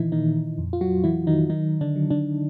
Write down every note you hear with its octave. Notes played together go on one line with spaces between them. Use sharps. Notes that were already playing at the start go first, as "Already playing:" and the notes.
Already playing: A#2 D#3 E3 D#4 E4
A#2 D#3 D#4
F2
F4
F#3 F#4
E3 F#3 E4
D#3 D#4
D#3 F#3 D#4
D3 D4
F#3
D3 D4